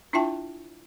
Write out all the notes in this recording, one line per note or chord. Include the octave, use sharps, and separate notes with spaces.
D4 E4 F4 E5 G5 A5